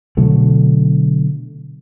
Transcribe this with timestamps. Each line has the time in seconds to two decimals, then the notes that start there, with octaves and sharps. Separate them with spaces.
0.17 B2 D3 F#3 A3